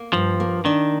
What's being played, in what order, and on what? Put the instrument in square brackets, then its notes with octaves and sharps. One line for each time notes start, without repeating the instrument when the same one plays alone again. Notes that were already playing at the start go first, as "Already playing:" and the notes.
Already playing: [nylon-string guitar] A#3
[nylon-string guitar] G2 [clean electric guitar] F3
[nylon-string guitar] A#3
[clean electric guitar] D#3 [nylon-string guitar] D4